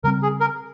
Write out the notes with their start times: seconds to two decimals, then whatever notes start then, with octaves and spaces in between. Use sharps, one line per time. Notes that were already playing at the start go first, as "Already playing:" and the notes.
0.04 C#3 G3 C4 A#4
0.22 G#4
0.40 A#4